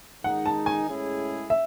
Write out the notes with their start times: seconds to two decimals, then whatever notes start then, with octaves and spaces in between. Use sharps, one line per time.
0.24 D#3 G#3 D#4 F#5
0.46 A5
0.66 G#5
0.88 A2 G#3 C#4 E4 G#4
1.50 E5